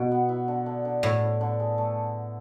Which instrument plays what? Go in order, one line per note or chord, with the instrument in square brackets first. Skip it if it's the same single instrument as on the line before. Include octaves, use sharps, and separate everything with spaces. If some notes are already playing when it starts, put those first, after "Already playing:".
Already playing: [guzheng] B2 [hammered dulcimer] F#4
[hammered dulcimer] B3
E4
D3
D3
D3
[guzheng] A2 [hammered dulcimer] E4
[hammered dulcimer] E4
D3
G#4
A3